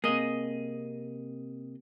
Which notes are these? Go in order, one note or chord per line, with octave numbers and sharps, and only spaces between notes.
C3 A#3 G#4 D#5